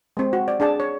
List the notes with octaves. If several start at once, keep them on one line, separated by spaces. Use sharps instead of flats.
G#3 C4
F#4
D5
D4 G#4 D5 A5
C#5